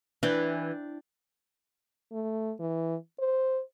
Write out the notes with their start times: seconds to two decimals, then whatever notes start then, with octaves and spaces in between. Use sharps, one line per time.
0.23 E3 D4 G5
2.12 A3
2.59 E3
3.19 C5